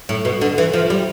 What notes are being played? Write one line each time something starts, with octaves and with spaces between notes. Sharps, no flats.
A2
B2
D3
E3
F3
G3